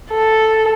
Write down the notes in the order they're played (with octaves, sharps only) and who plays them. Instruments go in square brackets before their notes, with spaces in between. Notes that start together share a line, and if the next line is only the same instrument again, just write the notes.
[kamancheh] A4